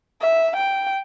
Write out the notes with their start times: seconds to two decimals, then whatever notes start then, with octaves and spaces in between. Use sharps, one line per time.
0.21 E5
0.56 G5